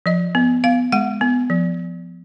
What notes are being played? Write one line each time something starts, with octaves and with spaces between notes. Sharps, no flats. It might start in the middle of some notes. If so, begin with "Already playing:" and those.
F3 D#5
B3
B3 F5
G#3 F#5
B3
F3